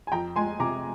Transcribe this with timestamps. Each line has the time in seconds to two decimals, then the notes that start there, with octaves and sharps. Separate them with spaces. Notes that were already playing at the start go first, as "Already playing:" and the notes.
0.07 G#5
0.12 F2 G5 A#5
0.36 G#3 G#5 C6
0.60 C3 A#5 D6